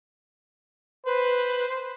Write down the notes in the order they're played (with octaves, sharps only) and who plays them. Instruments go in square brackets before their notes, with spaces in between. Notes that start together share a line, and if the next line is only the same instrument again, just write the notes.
[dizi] B4 [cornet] C5